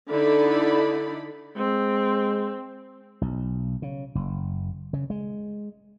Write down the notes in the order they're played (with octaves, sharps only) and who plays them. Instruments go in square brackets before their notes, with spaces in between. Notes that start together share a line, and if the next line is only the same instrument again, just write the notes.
[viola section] D3 D#4 E4 A4 D5 B5
[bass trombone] G#3 [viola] C4
[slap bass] B1
C#3
F#1
C#3
G#3